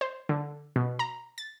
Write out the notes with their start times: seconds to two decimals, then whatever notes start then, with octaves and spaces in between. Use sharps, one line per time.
0.01 C5
0.29 D3
0.76 B2
0.99 A#5
1.38 A6